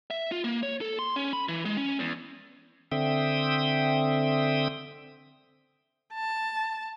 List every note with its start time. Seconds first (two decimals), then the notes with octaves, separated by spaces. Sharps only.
0.10 E5
0.32 F4
0.44 A#3
0.63 C#5
0.81 A4
0.99 C6
1.16 C#4
1.33 B5
1.48 E3
1.65 G#3
1.77 C#4
1.99 E2
2.91 D3 C4 E5 G5 D#6
6.14 A5